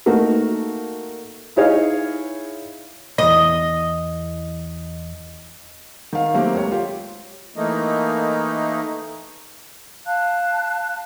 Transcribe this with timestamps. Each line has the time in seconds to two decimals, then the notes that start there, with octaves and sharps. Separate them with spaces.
0.06 A3 A#3 D#4 F#4
1.56 D#4 E4 G#4 C#5 D#5 F5
3.18 B1 E2 D#5
6.13 D#3 F5
6.34 F#3 A3 A#3 C4 F#4 G4
6.55 C#2 G4 C#5
6.72 F4 G4
7.56 E3 A3 A#3 D#4
10.06 F5 A5 F#6